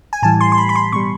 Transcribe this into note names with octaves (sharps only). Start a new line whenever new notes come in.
G#5
A2 E3 G3 A5
C6
C6
B5
B5
C6
B2 G3 C#6